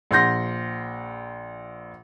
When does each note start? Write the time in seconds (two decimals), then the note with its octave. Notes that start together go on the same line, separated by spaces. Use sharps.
0.11 A#1 F#5 C6 G6 A#6